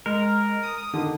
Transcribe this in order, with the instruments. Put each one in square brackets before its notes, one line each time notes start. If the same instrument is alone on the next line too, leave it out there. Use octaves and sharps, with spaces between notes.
[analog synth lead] G#3 [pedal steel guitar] A#4
[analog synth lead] D#6
[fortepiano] D3 D#3